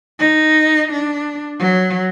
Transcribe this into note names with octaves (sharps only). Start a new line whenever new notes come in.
D#4
D4
F#3